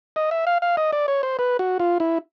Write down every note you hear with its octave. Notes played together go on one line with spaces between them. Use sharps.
D#5
E5
F5
F5
D#5
D5
C#5
C5
B4
F#4
F4
E4